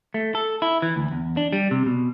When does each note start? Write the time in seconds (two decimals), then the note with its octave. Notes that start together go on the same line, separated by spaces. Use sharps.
0.14 A3
0.35 A4
0.62 E4
0.82 E3
0.96 D2
1.11 E2
1.37 D4
1.53 G3
1.71 C3
1.86 B2